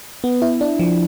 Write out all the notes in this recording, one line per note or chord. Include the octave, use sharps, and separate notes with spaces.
B3
E4
D4
F3